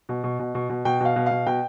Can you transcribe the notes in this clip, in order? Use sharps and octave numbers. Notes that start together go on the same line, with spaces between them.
B2
B2
B2
B2
B2
B2 G5
B2 F5
B2
B2 F5
B2 G5